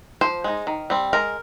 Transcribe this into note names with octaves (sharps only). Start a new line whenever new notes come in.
F3 C5
G#3 D#4
D#3
G3 C4
G#3 A#4